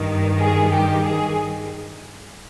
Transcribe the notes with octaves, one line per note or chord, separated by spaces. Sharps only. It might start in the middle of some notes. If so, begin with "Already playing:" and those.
Already playing: G2 D#3
G#4
G4
G#4